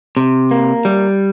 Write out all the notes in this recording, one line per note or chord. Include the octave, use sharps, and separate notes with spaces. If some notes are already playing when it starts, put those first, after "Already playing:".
C3
A#3
G3